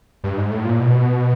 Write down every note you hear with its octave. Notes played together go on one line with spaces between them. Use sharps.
G2
G#2
A2
A#2
B2